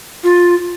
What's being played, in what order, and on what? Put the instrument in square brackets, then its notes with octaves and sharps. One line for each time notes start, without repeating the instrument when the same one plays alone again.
[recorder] F4